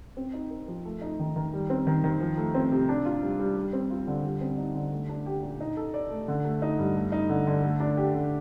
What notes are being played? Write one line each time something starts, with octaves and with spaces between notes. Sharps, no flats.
C4
D#4
A#4
F3
A3
D#4
D#3
D#3
G3
C4
D#3
D#3
F3
A3
C4
C3
D4
F4
G3
G3
G3
C4
F4
D3
G3
C4
D#4
D3
A3
D4
G4
A#2
D#4
A4
D5
A3
D3
A3
D#4
G2
A3
D#4
D3
D3
A3
D4
G4
D3